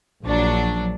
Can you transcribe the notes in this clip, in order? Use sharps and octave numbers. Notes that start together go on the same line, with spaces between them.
A#1 F#3 D4